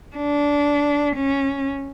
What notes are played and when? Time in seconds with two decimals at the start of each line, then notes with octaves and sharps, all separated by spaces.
0.16 D4
1.16 C#4